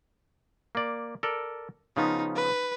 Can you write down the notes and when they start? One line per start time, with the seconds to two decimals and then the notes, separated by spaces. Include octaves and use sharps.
0.75 A#3 D5
1.23 A4 A#4 D5
1.97 C#3 F3 B3 D#4
2.36 B4